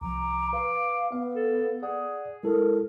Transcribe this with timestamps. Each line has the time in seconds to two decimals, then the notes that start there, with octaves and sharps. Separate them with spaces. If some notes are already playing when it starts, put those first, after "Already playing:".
0.01 C2 F3 A#5 D6
0.53 B4 F5
1.12 B3 F5
1.35 A4
1.83 G#4 D5 F#5
2.43 G#3 E4 A4 A#4